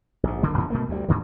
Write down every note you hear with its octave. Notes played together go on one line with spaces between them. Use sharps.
A#1 G#2
F#1 D2 D3 A#3
F#2 D3 F3 B3
B2 A3 A#3
D2 G3
D2 G#2 D3 E3